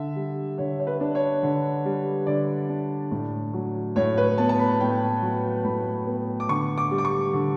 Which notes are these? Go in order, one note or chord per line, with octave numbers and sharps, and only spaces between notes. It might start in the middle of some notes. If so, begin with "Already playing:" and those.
Already playing: D3 E5
G3
D3 C#5
C#5
B4
D4
C#5
D3
G3
D3 D5
D4
A2
F#3
A2 C#5
B4
B3 A5
A5
B5
A2 G5
F#3
A2 B5
B3
D6
D3 C#6
D6
G3
D6
C#6
D3